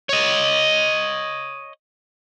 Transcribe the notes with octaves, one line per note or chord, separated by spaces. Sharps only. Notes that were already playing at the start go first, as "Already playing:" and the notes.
C#5 D#5